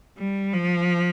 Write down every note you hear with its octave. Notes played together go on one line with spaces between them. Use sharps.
G3
F3